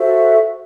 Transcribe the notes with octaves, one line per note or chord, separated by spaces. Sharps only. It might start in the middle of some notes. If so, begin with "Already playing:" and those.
Already playing: F#4 A4 C5 E5